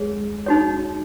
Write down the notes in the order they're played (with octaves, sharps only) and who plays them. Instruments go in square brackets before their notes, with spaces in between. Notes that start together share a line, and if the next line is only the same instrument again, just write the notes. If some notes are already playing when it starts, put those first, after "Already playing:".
Already playing: [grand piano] G#3 [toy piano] G#4 C#5
[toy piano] D#4 F#4 C#5